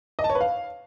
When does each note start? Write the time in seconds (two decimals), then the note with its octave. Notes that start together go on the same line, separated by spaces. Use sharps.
0.19 D#5
0.24 A5
0.30 C#5
0.35 B4
0.41 F5